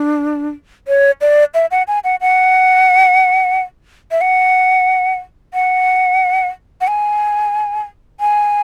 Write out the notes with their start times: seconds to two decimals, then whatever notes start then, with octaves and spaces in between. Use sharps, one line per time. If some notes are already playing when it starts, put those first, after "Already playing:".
Already playing: D4
0.88 C#5
1.21 D5
1.54 E5
1.71 F#5
1.88 G#5
2.04 F#5
2.21 F#5
4.11 E5
4.21 F#5
5.54 F#5
6.81 F#5
6.87 G#5
8.20 G#5